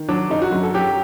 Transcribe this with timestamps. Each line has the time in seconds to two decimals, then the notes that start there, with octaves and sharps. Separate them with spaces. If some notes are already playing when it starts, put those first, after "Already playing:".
Already playing: D#3
0.09 F#3 D4
0.30 F#2 D#4
0.42 F#4
0.52 F#2
0.63 A4
0.74 F#3 G4